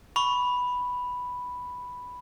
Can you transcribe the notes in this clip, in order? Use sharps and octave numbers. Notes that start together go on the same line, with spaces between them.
B5 C#6